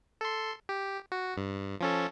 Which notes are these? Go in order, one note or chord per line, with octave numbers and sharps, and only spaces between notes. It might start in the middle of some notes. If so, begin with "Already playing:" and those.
A4 C6
G4
F#4
G2
F3 C#4 A4